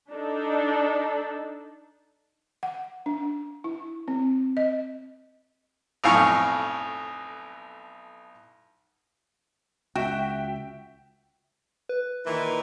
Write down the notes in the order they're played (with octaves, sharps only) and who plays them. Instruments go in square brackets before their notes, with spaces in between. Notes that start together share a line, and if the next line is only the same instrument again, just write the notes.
[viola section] D4 D#4 A4
[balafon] F#5
D4
E4
C4
D#5
[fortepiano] B1 F2 A2 F5 G#5 C#6
[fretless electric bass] C#2 [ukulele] F#4 [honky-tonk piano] E5 G5
[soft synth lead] B4
[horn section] A#2 D#3 E3